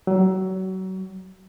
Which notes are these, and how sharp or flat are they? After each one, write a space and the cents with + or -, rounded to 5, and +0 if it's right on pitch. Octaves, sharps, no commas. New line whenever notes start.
F#3 +30